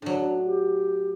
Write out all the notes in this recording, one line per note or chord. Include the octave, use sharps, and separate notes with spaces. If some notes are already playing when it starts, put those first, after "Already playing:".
A2 F#3 D4
G4